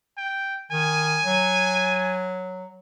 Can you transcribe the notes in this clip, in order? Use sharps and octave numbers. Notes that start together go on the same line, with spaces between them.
G5
D#3 G#5
F#3